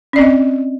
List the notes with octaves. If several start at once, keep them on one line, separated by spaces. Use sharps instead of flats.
C4 C#4 D5 D#5